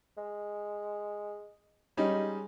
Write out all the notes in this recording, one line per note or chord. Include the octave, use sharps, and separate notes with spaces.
G#3
G3 G#3 C#4 D#4